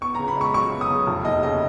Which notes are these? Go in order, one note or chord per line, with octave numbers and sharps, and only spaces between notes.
B3 C#6
C#3 A#5
B5
G#3 C#6
F#2 C#6
B3
D#6
C#3
F1
D#2 D#5
C#3 D#5